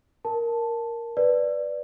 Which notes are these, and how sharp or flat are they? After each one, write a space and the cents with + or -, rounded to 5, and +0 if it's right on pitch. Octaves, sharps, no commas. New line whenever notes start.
A#4 +0 A5 +0
B4 +0 D5 +0